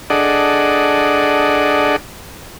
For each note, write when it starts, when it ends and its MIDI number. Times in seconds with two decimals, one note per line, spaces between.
0.10 1.96 62
0.10 1.96 68
0.10 1.96 69
0.10 1.96 74
0.10 1.96 75
0.10 1.96 78